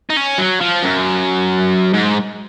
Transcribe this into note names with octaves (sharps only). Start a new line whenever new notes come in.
D#4
C#4
F#3
F3
F#2
G#2